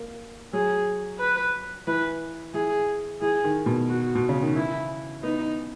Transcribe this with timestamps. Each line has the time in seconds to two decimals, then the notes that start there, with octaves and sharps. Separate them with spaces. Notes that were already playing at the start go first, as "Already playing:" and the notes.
Already playing: A#3
0.53 F#3 G#4
1.20 B4
1.87 E3 B4
2.54 E3 G#4
3.21 E3 G#4
3.44 D#3
3.66 B2
3.89 F#4
4.15 B2
4.29 C#3
4.42 D#3
4.55 E3 E4
5.23 B3 D#4